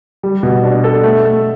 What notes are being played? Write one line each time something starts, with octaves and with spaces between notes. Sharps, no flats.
G3
B2
D4
A4
A3
A3